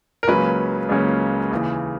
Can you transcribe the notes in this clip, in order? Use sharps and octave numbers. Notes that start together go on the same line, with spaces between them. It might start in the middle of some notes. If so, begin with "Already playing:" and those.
A#4
C#2 C#3 F#3 A#3 C#4 B4
C#2 C#3 F#3 A#3 C#4
D#2 C#3 E3